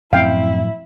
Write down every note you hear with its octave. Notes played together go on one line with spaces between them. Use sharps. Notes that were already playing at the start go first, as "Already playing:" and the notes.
F#2 A2 F3 F#3 C4 E4 F5 G5